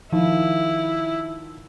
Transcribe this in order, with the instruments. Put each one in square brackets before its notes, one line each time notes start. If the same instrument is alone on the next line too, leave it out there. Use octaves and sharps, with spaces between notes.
[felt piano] D#3 F3 [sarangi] E4